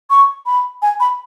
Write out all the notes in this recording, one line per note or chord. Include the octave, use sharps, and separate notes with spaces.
C#6
B5
G#5
B5